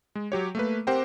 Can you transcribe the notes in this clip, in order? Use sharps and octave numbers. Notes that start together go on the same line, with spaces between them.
G#3
F#3 G4 C#5
A3 A#3 B4
C4 G4 A#4 C5 F#5 G5